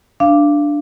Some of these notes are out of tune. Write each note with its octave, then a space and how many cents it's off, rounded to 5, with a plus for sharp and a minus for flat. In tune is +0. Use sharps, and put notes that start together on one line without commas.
D4 +0 F5 -25